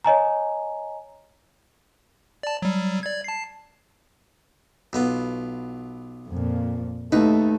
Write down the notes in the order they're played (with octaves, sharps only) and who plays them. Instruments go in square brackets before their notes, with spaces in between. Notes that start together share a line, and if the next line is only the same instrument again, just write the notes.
[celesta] C#5 D#5 G#5 A#5
[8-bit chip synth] D5 A5
F#3 G3
D5 G#6
A5 C7
[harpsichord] B1 B3 F4
[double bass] F2 A#2
[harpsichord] D#2 B4 [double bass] A3 [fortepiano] D#4